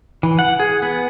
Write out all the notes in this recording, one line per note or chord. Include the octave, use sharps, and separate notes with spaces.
E3
F#5
G#4
B3